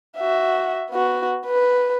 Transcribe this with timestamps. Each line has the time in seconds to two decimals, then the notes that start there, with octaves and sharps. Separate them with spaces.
0.18 F#4 E5
0.91 B3 F#4
1.46 B4